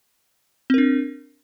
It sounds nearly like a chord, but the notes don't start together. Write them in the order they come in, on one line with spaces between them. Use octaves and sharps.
C4 A#4 D4